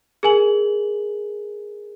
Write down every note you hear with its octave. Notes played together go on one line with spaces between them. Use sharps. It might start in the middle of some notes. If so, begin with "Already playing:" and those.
G#4 A#4 G#5 F#7